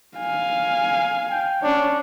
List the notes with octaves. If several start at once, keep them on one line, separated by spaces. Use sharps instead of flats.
F5 G#5
G5
C#4 D4 C#5